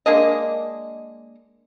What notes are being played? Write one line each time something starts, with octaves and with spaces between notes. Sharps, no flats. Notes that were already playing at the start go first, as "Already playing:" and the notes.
G#3 A#3 D4 D#5